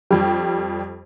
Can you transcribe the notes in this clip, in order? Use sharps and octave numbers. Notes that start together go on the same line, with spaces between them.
F2 G3